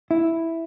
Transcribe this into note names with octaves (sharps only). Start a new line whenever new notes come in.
E4